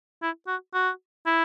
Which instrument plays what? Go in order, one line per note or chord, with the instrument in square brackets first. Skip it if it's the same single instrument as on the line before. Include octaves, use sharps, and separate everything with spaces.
[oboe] E4
F#4
F#4
E4